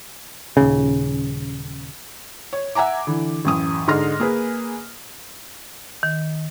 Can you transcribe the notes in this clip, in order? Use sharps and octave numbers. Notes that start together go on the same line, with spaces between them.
D#1 C#3
C#5
E5 F#5 G#5 A#5 D6
D3 E3
A1 F#2 D#6
G#2 D3 D#4 C6 F6 A#6
A#3 G#4 B4
D#3